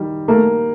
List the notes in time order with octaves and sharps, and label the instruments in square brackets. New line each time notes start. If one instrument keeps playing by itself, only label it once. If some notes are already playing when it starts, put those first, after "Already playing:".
Already playing: [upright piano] D#3 G3
[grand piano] A3 [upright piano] A#3